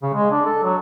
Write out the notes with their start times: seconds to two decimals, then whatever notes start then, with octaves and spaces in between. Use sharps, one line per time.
0.02 C#3
0.14 G#3
0.31 D4
0.45 A4
0.62 F#3